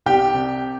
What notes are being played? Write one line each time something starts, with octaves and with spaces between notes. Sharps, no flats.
C2 G4 G5
C3